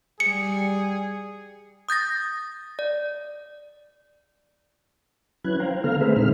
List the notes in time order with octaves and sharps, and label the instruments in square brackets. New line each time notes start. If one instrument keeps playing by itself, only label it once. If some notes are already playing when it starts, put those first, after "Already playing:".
[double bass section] G3 [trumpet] G#4 [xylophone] C#7
[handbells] D#6 G6 A6 A#6
D5
[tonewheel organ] F#3 C#4 E4 B4 F#6 G#6
C5 F5 G5 A#5
C5
D3 B3 A4 F5 A#5 F6
A3 C4 G#4 B4 C5 E5
A#2 D3 G#3 D#4 F6